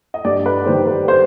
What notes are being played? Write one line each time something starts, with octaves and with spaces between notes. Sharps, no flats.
D#5
G2 D5
B4
D#3 G3 C5
B4
C5